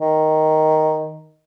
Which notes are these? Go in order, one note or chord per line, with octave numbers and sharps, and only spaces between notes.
D#3